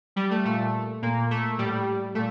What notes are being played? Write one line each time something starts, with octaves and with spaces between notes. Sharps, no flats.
G3
A3
A#2 A3
A#2 A#3
A3
A2 G3
A#2 A3